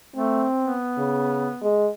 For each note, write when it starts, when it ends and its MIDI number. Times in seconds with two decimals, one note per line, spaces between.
0.16 0.45 57
0.16 0.75 60
0.61 1.67 59
0.98 1.49 49
1.62 1.88 56